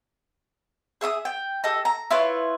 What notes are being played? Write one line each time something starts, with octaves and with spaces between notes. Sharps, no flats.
G#4 E5 D6 D#6
G5
G4 A4 D#5
A#5
E4 F4 B4 C#5